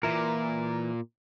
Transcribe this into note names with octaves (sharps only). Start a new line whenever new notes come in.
A#2 E3 E4 A#4